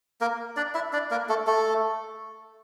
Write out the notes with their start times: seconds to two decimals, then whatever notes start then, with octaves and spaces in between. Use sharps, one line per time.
0.21 A#3 A#4
0.56 D4 D5
0.74 E4 E5
0.93 D4 D5
1.11 A#3 A#4
1.29 A3 A4
1.47 A3 A4